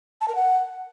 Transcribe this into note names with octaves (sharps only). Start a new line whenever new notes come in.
A5
A#4
F#5